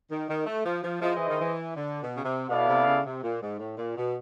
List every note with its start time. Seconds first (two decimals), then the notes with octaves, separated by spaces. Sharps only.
0.10 D#3
0.29 D#3
0.46 A3
0.65 F3
0.84 F3
1.02 F3 E4 G#4 C5 D#5
1.15 E3
1.28 D#3
1.41 E3
1.76 D3
2.01 B2
2.17 C#3
2.24 C3
2.49 B2 B3 E4 A4 D5 F5
2.68 C3
2.86 C#3
3.05 C3
3.23 A#2
3.41 G#2
3.59 A2
3.78 A#2
3.97 B2